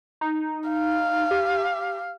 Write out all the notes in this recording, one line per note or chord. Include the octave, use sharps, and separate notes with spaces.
D#4
F5
G4